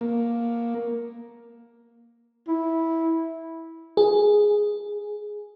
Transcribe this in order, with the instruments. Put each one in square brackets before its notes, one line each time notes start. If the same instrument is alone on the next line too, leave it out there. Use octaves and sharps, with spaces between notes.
[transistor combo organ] A#3
[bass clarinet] E4
[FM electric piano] G#4